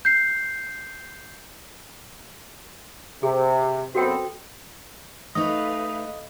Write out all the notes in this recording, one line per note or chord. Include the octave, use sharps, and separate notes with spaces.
G6 C7
C3 G#4
F#2 B3 C4 F#4 A4 G5
A3 D#4 A4 B4 D#5 F5